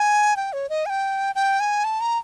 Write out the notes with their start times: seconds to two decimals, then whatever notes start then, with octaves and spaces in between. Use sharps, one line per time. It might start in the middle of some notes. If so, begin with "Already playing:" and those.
Already playing: G#5
0.36 G5
0.53 C#5
0.70 D#5
0.86 G#5
0.90 G5
1.35 G5
1.60 G#5
1.84 A5
2.01 A#5